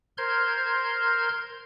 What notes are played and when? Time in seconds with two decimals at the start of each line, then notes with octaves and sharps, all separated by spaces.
0.18 A#4 C5 C6 F6 G6 G#6